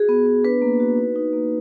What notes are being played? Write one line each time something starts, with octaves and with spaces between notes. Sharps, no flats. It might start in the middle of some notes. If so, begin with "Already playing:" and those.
Already playing: F#4 G#4
B3
B3
D4 B4
A#3
F#4
D#4
D#4
A#3